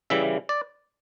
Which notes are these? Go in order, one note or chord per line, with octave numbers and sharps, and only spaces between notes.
C#3 E3 G3 E5
D5